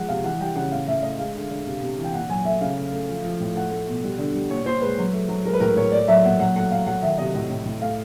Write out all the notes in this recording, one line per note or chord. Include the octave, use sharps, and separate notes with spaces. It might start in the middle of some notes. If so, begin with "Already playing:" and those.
Already playing: F3 G#3 F#5
C3 F5
E3 F#5
G3 G5
C#3 F#5
A2 F5
A2 E5
A3 D#5
G#3 F5
D3
D3
C3
C3
E3
G5
A#2 F#5
F#3 G#5
A3 E5
C#3 F5
A3
A3
F3
F3
A2
A3 F#5
A3
B2
G3
D3
G3
A#2 C#5
A#2 C5
G#3 B4
F#3
A3
F#3
G#3 A#4
B4
A2 A#4
A2 C#5
A3 D5
F#3 E5
A#2 F#5
F#3 F#5
A3 F#5
A3 F5
F#3 F#5
D#3 E5
C3 D#5
A2 D#5
A2
A2
A3 F5